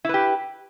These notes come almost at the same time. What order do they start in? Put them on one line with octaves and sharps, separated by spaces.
E4 B4 G4